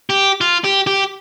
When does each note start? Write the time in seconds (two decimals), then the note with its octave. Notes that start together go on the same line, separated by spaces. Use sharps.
0.10 G4
0.41 F4
0.64 G4
0.87 G4